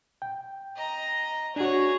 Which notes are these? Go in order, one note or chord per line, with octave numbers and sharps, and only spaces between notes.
G5
D#5 A#5
D4 F#4 G#4 C#5